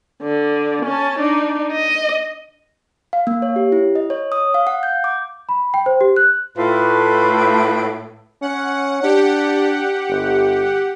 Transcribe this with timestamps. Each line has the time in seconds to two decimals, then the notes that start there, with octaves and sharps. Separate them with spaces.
0.22 D3
0.85 C#4 A5
1.19 D4 D#4
1.72 D#5
3.13 F5
3.27 A#3
3.42 C#5
3.56 G4
3.72 E4
3.95 D#5
4.10 C#5
4.32 D#6
4.54 F5
4.67 F#5
4.83 G6
5.04 D6
5.49 B5
5.74 G5
5.86 C5
6.01 G4
6.16 F#6
6.58 A2 A3 F4 B4
8.42 C#4 F#5
9.03 D4 G4 F#5
10.09 G1